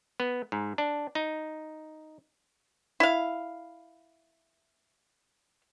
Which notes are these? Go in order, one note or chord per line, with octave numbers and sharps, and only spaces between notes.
B3
G#2
D4
D#4
E4 F5